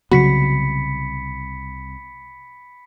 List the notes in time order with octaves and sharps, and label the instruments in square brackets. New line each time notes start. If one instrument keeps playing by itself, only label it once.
[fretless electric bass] C2 [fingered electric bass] C#3 F#3 B3 [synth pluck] F#4 [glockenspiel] B5 B6 C#7